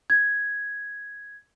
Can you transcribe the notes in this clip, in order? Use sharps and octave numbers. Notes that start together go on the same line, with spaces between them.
G#6